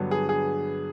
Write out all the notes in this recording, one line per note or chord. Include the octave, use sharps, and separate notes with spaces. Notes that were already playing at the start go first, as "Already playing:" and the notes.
Already playing: G2 D3 F#3 B3
G#4
G#4